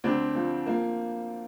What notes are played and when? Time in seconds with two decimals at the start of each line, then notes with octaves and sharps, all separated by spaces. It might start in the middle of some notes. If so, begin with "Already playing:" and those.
0.04 D2 C4 D4
0.35 F3
0.66 F3 A#3